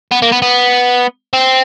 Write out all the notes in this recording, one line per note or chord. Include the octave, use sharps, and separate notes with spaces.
B3
A#3
B3
B3
C4